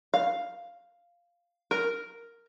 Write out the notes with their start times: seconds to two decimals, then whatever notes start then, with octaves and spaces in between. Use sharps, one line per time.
0.14 F5
1.71 A#4